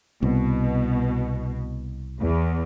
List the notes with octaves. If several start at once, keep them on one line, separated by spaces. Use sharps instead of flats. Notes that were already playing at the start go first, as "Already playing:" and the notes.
C2 B2
E2